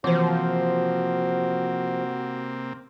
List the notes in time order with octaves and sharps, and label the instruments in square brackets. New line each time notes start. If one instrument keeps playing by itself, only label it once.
[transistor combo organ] C3 A#3 C4 [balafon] E3 C5 [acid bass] F3 [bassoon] F#4